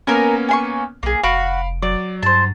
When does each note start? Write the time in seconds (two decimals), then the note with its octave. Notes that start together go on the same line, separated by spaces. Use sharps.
0.07 A#3 B3 C#4 A#4 G#5
0.49 G#5 C6 C#6
1.03 B1 A#3 G#4
1.23 F1 F#4 F5 B5 D7
1.82 F#3 D5
2.23 G2 C5 A5